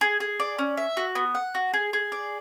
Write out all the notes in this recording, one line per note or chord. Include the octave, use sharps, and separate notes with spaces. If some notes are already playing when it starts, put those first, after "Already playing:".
G#4
G#4
D5
C#4
E5
F#4
B3
F#5
F#4
G#4
G#4
D5